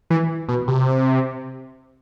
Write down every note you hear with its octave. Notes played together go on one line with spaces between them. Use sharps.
E3
B2
C3